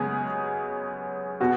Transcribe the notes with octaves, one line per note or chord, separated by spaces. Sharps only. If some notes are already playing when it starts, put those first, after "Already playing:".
Already playing: F#2 C#3 G#3 B3 G#4
B2 B3 F#4